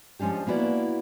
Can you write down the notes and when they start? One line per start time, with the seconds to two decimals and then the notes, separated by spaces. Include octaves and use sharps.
0.19 F3 G#3 C#4 D4 G4
0.47 A#3 B3 E4 F#4 D5